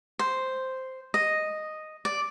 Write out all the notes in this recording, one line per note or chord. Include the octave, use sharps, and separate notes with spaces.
C5
D#5
D5